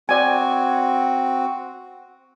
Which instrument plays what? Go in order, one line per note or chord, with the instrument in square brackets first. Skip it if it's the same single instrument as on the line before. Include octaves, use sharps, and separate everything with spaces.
[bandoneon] C4 F#4 [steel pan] D5 G#5